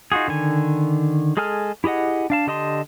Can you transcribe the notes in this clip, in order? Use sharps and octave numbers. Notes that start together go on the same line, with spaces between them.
D#4 F4 F#4 G#4
D3 D#3 G#5
G#3 G#4 A4 G#5 F6
E4 G4 G#4 D#5 F#5
D4 F5 A5
D3 G4 D#5 A5 C6